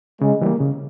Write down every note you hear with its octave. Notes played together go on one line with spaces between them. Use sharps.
C#3 G#3
E3 G3 A#3
C#3